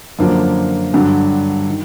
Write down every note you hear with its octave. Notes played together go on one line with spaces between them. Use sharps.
F#2 D3 F3 A#3 D4
G2 D3 F#3
D#3